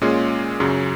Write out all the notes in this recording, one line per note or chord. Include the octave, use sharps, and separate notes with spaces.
A#2 G#3 C#4 F4 G#4
F#2 C#3 F#3 C#4